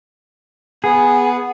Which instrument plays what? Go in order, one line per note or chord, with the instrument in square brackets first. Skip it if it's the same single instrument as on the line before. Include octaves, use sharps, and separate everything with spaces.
[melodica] B3 [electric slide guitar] G#4